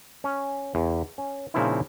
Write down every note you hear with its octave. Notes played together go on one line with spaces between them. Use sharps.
C#4
E2
C#4
A#2 C#3 F3 C4 D#4 E4